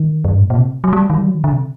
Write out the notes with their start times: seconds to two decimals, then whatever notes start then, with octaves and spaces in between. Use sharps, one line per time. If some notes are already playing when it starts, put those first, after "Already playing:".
Already playing: D#3
0.25 F#2
0.33 G2
0.41 A2
0.50 A#2
0.58 C3
0.84 F#3
0.93 G3
1.10 D#3
1.18 G3
1.27 F#3
1.35 D#3
1.44 D3
1.52 C3